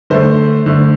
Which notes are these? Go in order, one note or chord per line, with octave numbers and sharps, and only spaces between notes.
D3 A3 C5
D3 A3